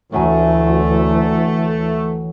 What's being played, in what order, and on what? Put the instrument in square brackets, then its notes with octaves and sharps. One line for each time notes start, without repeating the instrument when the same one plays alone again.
[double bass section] D2 [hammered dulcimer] A2 F#3 G#5 [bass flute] E3 [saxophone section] A3